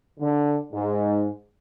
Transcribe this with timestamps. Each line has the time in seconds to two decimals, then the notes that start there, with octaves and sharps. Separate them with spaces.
0.19 D3
0.72 G#2